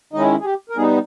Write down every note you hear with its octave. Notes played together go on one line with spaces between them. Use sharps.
D#3 G#3 C#4 D#4 E4 D#5
G#4
G4
A#4
G3 B3 D#4 G#4